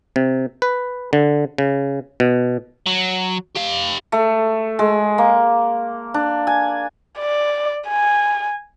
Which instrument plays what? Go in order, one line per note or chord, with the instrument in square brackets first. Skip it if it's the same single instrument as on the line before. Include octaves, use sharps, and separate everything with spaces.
[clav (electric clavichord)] C3
B4
D3
C#3
B2
[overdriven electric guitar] F#3
G4 F5
[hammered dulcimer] A3
G#3
A#3
D4
G#5
[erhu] D5
G#5